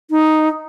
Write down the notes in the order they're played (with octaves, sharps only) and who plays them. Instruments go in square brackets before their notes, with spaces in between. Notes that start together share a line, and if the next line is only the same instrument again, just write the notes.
[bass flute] D#4